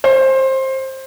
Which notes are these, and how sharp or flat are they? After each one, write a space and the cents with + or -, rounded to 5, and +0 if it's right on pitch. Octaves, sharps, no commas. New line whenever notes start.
C5 +20